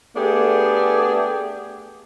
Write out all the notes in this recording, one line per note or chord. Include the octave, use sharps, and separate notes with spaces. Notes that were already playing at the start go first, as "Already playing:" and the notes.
A3 B3 D4 G4 G#4